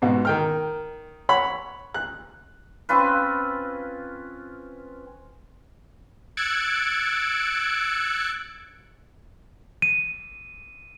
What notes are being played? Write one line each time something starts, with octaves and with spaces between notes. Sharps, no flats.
G#2 B2 F#4
D#3 G5 F6
C#5 F#5 B5
F#6
C4 C#4 F4 B4
E6 F#6 G#6 A6 C#7 D7
D#7